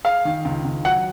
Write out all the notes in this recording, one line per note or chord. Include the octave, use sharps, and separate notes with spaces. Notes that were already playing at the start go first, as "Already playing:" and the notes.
G#4 F5
D#3
C#2
C#2
F#3 F#5